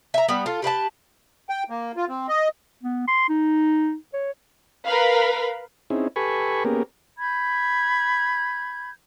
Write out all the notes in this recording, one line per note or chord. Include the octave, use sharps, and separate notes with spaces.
E5 A#5
G3 B3
F4 A4
G4 B4 F5 A5
G5
A#3
F4
C4
D#5
B3
C6
D#4
C#5
A#4 B4 F5 B5
C4 C#4 D#4 E4 G#4
G4 A4 B4 G#5 B5 C#6
A#3 B3 C#4 G4 G#4 A#4
B5 G6 G#6